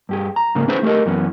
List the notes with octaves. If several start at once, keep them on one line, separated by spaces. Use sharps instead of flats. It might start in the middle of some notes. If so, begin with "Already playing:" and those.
G2 G4 G#4
A#5
G#2 C#3 G#3 A#3
C#4 E4 G#4 B4 C5
A3 G4 A#4 D#5
F#2 E3 B3 C#4